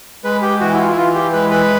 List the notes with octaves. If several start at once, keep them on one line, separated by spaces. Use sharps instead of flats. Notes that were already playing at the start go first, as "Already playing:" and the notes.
G#3 B4
G4
E3 F#4
E4
F4
E4
E3 F4
G4
G#3 B4
B4